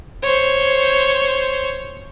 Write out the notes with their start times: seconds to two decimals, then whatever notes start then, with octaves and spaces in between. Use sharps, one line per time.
0.23 C5 C#5